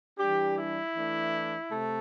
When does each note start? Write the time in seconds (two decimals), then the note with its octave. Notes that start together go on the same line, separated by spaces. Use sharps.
0.18 E3 G3 D4 G4
0.57 E4
0.95 E3 A3 D4
1.71 C3 A3